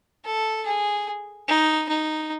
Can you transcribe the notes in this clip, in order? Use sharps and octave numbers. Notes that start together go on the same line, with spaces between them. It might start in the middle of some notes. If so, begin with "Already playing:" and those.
A4
G#4
D#4
D#4